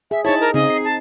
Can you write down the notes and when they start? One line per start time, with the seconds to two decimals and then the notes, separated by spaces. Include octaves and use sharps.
0.11 G#4 E5
0.24 D#4 E4 G#4 C5 C#5 A5
0.41 A#4
0.54 C#3 C4 D#4 G#4 D#5
0.70 C7
0.84 A5